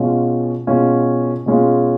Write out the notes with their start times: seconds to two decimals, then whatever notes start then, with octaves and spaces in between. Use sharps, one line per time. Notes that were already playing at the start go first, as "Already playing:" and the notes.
Already playing: B2 G#3 C#4 F4
0.67 B2 G#3 C#4 F4
1.46 B2 G#3 C#4 F4